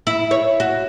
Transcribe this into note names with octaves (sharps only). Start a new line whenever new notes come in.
E4
C#5
F#4